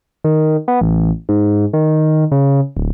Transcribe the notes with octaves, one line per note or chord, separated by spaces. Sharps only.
D#3
B3
A1
G#2
D#3
C#3
D1